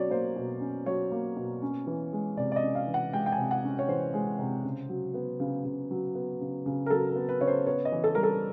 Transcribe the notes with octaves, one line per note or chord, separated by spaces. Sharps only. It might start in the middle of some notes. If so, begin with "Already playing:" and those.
Already playing: B2 F#3 C#4 C#5 D5
A#3 C5
B2
C#4
F#3 C#5
A#3
B2
C#4
E3
G#3
C3 D5
D5
D#5
C#4
F5
E3
F#5
G#3 G5
G5
G#5
C3
F#5
C#4
C#5
E3 C5
G#3
C3
C#3
F#3
B3
C#3
C#3
F#3
B3
C#3
C#3
A#4
F#3 A4
A#4
B3
B4
C#3 C#5
C5
B3 C#5
D#5
E3
A4
G3 A#4
A4